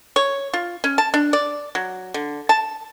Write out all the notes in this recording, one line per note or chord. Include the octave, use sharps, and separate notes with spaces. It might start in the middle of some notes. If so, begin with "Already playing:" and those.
C#5
F4
C#4
A5
D4
D5
F#3
D3
A5